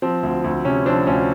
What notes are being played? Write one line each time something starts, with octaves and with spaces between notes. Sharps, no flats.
F3 C4
D2
D2
C3 C#4
F3 C4 D4
D2 C#4